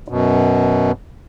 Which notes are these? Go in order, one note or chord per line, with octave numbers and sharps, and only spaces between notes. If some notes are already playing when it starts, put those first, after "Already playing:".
F#2 B2